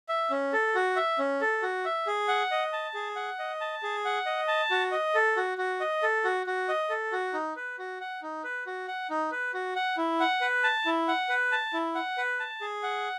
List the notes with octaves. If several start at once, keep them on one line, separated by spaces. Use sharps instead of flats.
E5
C#4
A4
F#4
E5
C#4
A4
F#4
E5
G#4
F#5
D#5
A5
G#4
F#5
D#5
A5
G#4
F#5
D#5
A5
F#4
D#5
A4
F#4
F#4
D#5
A4
F#4
F#4
D#5
A4
F#4
D#4
B4
F#4
F#5
D#4
B4
F#4
F#5
D#4
B4
F#4
F#5
E4
F#5
B4
A5
E4
F#5
B4
A5
E4
F#5
B4
A5
G#4
F#5